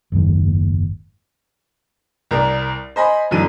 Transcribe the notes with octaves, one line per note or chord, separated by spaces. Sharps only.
F#1 D#2 G#2
C2 A#4 D5
C5 D#5 G#5 B5
G1 F#2 B2 D3 E3 D#7